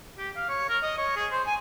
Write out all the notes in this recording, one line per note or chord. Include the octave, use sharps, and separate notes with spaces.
G4
F5
C#5
A#4
D#5
C#5
G#4
C5
G#5